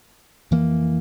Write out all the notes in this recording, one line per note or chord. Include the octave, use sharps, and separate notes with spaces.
F2 E3 A#3